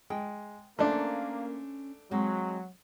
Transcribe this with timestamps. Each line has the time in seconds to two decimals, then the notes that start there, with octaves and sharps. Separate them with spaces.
0.10 G#3 G5
0.79 A3 A#3 C#4 D4 C5
2.11 F#3 G#3 C4